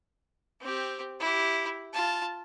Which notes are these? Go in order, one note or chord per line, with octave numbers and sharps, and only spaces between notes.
C4 G4
E4 G4
F4 A5